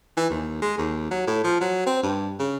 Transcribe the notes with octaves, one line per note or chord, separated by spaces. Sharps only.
E3
D#2
G#3
D#2
F#3
A2
F3
F#3
C4
G2
C#3